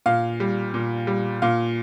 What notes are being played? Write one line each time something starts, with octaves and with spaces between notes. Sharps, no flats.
A#2 F5
G3
A#2
G3
A#2 F5